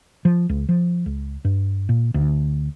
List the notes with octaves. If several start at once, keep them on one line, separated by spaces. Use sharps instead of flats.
F3
C#2
F3
C#2
G2
A#2
D2